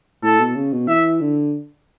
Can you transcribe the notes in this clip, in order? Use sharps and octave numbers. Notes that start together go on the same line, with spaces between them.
A2 A4
B2
C#3
B2
E3 E5
D3